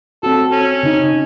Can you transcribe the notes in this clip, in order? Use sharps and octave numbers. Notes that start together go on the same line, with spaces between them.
C4 F#4 A4
C#4
C#3 D#4